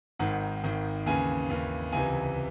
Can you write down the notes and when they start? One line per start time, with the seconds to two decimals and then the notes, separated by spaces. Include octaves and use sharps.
0.19 G#1 G#2 D#3 F#5
0.63 G#1 G#2 D#3
1.06 D#2 C#3 E3 G#5
1.50 D#2 C#3 E3
1.92 C#2 C3 E3 G#5